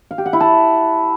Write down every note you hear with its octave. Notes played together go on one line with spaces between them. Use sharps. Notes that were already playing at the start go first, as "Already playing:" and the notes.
F5
G4
F#5
E4
A5